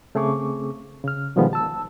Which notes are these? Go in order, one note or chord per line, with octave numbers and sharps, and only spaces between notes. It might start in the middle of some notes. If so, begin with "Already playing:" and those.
C#3 A3 C4 G#4 C#6 D6
C#3 F6
B2 D#3 F3 G3 G#3 B3
A5 E6